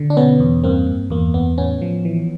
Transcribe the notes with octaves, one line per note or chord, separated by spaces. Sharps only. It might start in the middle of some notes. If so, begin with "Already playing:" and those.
Already playing: D3
D4
B2 B3 C#4
E2
G2 A#3 C4
G2
E2 A#3
E2 B3
A2 B3 C#4
F3
E3